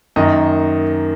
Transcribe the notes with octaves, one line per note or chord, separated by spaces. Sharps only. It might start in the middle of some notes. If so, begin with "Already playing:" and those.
F#2 D#3 A#3 D#5